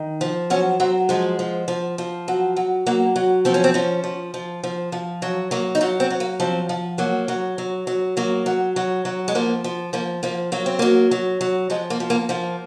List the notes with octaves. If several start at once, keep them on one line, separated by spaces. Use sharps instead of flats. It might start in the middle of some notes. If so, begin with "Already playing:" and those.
Already playing: D#3
F3
F#3 C#4
F#3 C4
F3 G#3
F3
F3
F3
F#3
F#3
F#3 A#3
F#3
F3 C4
C#4
C4
F3 C#4
F3
F3
F3
F3
F#3
F#3 A#3
D#4
F#3 F4
C4
F#3
A#3
F3 C4
F3
F#3 A#3
F#3
F#3
F#3
F#3 A#3
F#3
F#3
F#3
G#3
F3 A#3
F3
F3 A#3
F3 A#3
F#3 A#3
C4
F#3 A#3
F#3
F#3
F3 G#3
A#3
F3
A#3
F3 A#3